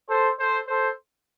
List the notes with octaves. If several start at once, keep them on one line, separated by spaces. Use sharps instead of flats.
A4 C5
A4 C5
A4 C5